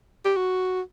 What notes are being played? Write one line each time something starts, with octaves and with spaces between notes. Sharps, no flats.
G4
F#4